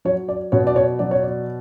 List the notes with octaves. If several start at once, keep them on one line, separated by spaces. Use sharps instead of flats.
F#3 C#5
D5
B2 C#5
D5
C#5
F#3 D5
C#5
D5